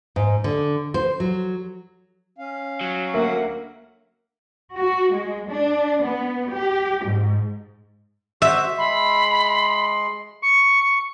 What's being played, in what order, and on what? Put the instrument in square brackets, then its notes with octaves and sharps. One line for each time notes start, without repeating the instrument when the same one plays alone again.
[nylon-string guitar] G#2
D3
C5
F#3
[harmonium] C#4 F5
[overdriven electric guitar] F#3
[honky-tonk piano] D2 A#4 E5 [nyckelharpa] A#3 F#5
[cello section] F#4
G#3
D4
B3
G4
G#2
[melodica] F#4 C5 [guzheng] E5
[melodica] G#3 C6 [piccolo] B5
[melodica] C#6 [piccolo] C#7